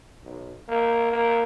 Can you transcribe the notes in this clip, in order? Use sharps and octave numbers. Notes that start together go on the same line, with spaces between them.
B1
A#3
A#3